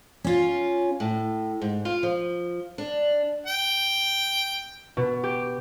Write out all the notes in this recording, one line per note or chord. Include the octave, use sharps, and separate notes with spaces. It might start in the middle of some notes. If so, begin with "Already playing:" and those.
C#4 F4
A2
G#2
F4
F3
D4
G5
B2
G4